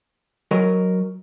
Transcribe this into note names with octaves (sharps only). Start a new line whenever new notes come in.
F#3 A#4 D#5